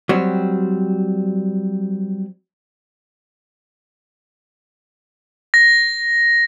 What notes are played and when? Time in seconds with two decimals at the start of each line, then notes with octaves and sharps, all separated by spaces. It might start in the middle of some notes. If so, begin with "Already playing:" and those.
0.09 F#3 G3 C4
5.54 A#6